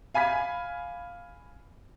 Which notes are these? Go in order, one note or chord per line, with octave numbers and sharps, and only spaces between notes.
F5 G#5 B5 G#6 B6